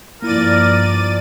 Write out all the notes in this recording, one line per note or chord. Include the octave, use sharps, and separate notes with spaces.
G2 F3 A#3 E4 A#4 D5 A6 D#7